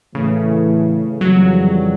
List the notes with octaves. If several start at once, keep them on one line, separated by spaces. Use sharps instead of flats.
A2 C#3 E3 A3
F2 C#3 E3 F#3 G3